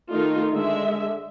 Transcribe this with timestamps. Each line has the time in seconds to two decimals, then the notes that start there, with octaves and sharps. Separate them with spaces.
0.12 D#3 A3 D#4 F4 A#4
0.52 D3 G#3 E5